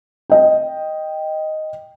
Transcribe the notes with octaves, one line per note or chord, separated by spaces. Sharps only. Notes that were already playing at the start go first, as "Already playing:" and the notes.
D#5 G5